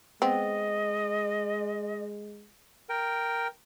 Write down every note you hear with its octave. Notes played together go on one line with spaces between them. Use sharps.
G#3 B3 C4 D#5
A#4 G5